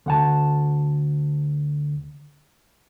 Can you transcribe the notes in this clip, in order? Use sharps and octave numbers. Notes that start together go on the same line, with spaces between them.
D2 F#5 A5